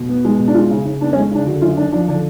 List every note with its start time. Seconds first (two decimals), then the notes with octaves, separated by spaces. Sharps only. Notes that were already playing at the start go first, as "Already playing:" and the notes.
Already playing: B2
0.09 B3
0.25 G#3
0.39 B2
0.48 D4
0.54 G#3 F4
0.70 C#3
0.85 C#3
1.01 B3 D4
1.13 C#4
1.16 G#3
1.31 C#3 D4
1.46 D3 F#4
1.62 F#2 F4
1.77 F#2 D4
1.92 F3 D4
2.08 D3 D4